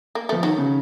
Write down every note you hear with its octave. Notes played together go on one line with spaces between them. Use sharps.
A#3
F3 A3
D#3 F#3
C#3